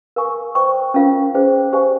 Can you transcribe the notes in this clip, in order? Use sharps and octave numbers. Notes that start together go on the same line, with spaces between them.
A#4 F5 G#5 C#6
C5 G5 C#6
C#4 F4 A#4 F5
D#4 G#4 C5 G5
G4 C5 F5 G#5 C#6